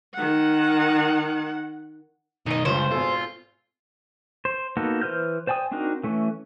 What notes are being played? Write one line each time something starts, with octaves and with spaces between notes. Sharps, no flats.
D#3 F#5
B1 D#3 D#4 D#5
C#2 G2 F4 C5 C#5
G#1 B2 F4 A4
C5
A#3 B3 D#4 F#4 A4
E3 B4 C5 F6 G6
C5 D5 G5 G#5 D#6
C4 D4 D#4 F#4 A#4
E3 A3 C#4